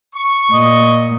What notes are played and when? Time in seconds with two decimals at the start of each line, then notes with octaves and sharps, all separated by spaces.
0.15 C#6
0.53 A#2 D#5